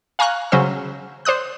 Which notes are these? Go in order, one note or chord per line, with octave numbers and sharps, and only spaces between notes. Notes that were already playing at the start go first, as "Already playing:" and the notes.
F5 G#5 A#5 C#6 F6 F#6
C#3 F#3 C#4 C5 E6
C5 D5 D#6 F#6